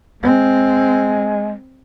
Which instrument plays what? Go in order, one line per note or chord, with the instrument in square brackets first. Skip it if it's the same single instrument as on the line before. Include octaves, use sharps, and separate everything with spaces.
[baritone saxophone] G#3 [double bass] C4